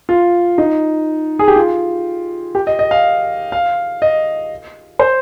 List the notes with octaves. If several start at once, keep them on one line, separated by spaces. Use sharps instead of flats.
F4
D#4
G#4
G4
F4
G4
D#5
D#5
F5
F5
D#5
C5